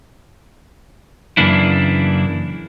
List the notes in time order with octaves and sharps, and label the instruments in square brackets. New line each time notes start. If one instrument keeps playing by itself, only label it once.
[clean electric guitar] F#2 C#3 E3 A#3 D4 E4